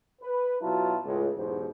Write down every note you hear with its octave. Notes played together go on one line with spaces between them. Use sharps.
B4
B2 F#3 E4 F4 A5
C#2 A2
B1 E2 G#2 B2 G4 C5